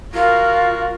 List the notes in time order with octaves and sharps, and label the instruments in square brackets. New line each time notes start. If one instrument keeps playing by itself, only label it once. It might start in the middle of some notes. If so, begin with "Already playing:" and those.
[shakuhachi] F4 [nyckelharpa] F#4 A#4